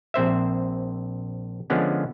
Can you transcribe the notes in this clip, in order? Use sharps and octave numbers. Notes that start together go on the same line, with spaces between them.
A#1 C4 C5 E5
D3 F3 G#3 B3 C#4